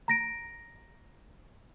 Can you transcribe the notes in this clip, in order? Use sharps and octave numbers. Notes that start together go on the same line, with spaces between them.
A#5 A#6 D7